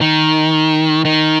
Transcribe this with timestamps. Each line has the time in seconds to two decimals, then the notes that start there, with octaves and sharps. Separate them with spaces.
0.01 D#3
1.05 D#3